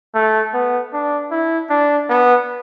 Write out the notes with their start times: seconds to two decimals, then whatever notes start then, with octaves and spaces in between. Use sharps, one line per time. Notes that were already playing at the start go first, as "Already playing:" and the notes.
0.15 A3
0.54 B3
0.93 D4
1.31 E4
1.70 D4
2.09 B3